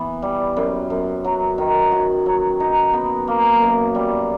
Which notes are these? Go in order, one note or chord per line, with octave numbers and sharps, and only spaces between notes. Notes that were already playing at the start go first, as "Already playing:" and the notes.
Already playing: E3 B3
G3
F#2
F#2
F#3
D#3
F#4
F#3
D#4
B3
A#3
F#2
G3